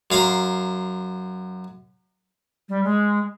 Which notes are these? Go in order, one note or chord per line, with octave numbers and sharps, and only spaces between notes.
F#2 F5 A#5 C6
G3
G#3